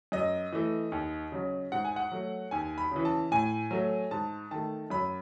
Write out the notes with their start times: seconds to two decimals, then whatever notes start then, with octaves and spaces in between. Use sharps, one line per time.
0.12 F#2 D#5
0.53 E3 A3
0.92 D#2
1.32 C#3 F#3
1.72 G#2 F#5
1.85 G#5
1.96 F#5
2.12 F#3 A3
2.51 D#2 G#5
2.78 B5
2.91 C#3 E3
3.05 A5
3.31 A2 G#5
3.71 F#3 A3
4.11 G#2 A5
4.51 D#3 A3 A5
4.90 F#2 B5